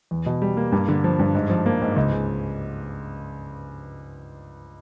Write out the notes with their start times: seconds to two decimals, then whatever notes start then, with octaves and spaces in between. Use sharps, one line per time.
0.11 E2
0.26 B2
0.42 G3
0.57 A#3
0.72 G2
0.88 D3
1.04 F3
1.19 G2
1.35 G#2
1.50 F3
1.66 A#3
1.81 G#2
1.96 C#2
2.12 C#3